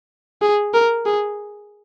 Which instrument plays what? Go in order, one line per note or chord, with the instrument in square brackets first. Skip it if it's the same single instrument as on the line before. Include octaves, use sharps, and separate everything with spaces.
[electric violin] G#4
A#4
G#4